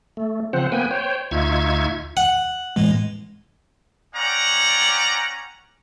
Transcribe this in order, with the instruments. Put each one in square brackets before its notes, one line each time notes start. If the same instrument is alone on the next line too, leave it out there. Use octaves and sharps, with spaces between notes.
[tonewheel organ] A3
C#3 F3 C4 C5 F#5
A#3 B3 B4 G5 G#5
C5 C#5 G5
D2 D#4 F4 E5 C#6 G#6
[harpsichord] F#5
[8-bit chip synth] A2 E3 G#3
[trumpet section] C#4 D5 F#5 G5 A#5